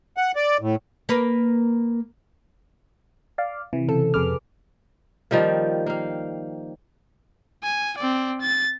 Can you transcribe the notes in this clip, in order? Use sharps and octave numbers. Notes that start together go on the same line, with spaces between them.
F#5
D5
A2
A#3 A#4 B4
D5 F5
C3 E3
C#3 C4 A4
F2 C3 G#4 B4 D6 F6
D#3 F3 G3 A#3
A#3 F5
G#5
C4 D5
A6